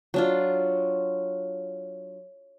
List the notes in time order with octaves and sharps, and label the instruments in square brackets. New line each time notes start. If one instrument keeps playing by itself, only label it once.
[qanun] F#3 D4 F4